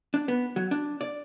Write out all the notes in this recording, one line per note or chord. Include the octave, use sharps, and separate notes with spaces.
D4
B3
F#3
D4
D5